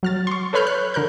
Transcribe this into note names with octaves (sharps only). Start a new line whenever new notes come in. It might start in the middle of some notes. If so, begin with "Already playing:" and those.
F#3 F6 A6
C6 C#6
A4 B4 C#5 B5 F6 G6
F#6
D3 A#4 F#6 G6